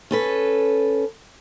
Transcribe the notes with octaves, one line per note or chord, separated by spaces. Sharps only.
C#4 A4 B4